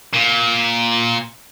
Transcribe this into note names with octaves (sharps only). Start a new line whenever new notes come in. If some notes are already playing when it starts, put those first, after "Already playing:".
A#2